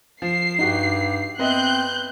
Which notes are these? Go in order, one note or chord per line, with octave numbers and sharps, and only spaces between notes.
F3 C7
G2 D#4 F#4 G4
B3 C4 D#5 E5 F#6 G6